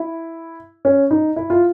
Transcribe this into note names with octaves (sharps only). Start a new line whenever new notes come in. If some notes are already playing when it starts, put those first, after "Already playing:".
Already playing: E4
C#4
D#4
E4
F4